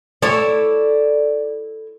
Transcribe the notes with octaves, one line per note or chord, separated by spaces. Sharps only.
E4 A4 C#5 D5